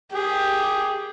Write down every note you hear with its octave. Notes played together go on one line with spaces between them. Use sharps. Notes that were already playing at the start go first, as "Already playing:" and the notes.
G4 G#4 G5